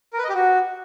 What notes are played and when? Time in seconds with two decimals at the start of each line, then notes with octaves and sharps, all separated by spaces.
0.13 A#4
0.18 B4
0.24 D#5
0.29 G4
0.35 F#4